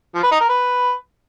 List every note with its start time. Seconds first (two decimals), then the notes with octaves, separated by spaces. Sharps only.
0.14 F3
0.23 B4
0.32 D#4
0.40 A#4
0.49 B4